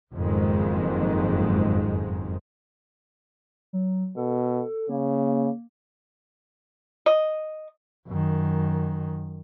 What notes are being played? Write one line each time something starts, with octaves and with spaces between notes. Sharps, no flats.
F#1 F2 G#2 D#3 G#3
F#3
B2 A4
C#3 A#3
D#5
F#2 D#3